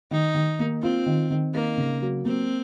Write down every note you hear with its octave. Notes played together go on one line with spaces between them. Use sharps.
D#3 D#4
D#3
A#3
C4 F4
D#3
D#3
A#3 D#4
C#3
F#3
A#3 C4